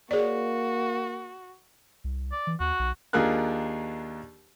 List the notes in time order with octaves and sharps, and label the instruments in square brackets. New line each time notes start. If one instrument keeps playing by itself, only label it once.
[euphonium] A#3 [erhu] F#4 [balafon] G#4 C#5 D5
[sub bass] C2
[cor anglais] D5
[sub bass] E3
[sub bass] D#2 [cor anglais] F#4
[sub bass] B1
[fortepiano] D#2 D4 F4 G#4 A#4 F#6